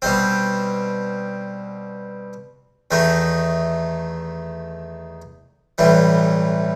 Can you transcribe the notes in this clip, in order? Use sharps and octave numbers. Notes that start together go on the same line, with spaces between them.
B2 G3 C4
E2 D#3 A3 D#4
B1 A2 E3 G3